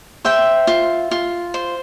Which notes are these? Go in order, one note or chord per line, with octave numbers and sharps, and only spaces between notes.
C5 E5 G5
F4
F4
C5